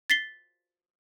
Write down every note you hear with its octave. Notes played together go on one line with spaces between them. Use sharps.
A6 B6 C7 G7